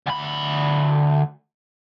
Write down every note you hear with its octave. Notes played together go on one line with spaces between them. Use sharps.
D2 B5